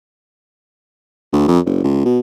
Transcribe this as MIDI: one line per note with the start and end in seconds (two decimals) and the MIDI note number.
1.33 1.46 38
1.47 1.59 41
1.66 1.82 30
1.84 2.03 37
2.05 2.19 47